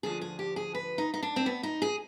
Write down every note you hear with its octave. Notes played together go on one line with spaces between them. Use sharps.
D2 D3 F3 G#4
G#4
G4
G#4
B4
D#4
D#4
D4
C4
B3
D#4
G#4